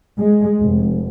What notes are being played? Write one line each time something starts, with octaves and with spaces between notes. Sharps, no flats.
G#3
F1